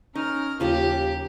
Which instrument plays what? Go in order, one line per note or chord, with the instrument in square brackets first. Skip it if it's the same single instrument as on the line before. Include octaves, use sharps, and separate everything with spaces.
[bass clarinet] C#4 [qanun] D#4 [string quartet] A#4 F6
[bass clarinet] D#2 [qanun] C#3 F3 A#3 [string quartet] G4